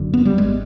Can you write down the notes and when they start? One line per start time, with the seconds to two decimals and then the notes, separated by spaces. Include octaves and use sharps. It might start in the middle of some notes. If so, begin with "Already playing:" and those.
Already playing: F#1 F#2 D3
0.14 B3
0.25 G3
0.38 G#1 G#3